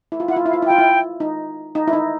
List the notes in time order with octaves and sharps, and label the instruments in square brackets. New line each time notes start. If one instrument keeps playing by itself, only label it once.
[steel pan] E4
F4
[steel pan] E4 [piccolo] F#5
[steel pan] F4
[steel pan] E4 [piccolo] F5
[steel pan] F4
E4
[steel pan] F4 [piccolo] G5
[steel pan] E4
D#4
D#4
E4
D#4